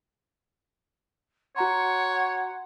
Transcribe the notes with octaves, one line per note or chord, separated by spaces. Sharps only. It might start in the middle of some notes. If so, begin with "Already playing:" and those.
F#4 C#5 F#5 A#5 C6